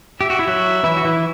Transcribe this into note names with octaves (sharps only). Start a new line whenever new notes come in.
G4 E5
F#4
E4
F#3 F#4
E3 E4
F#4
E3 E4